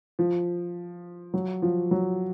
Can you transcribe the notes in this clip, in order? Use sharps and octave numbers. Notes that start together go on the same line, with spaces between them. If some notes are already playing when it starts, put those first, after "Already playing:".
F3
F#3
F3
F#3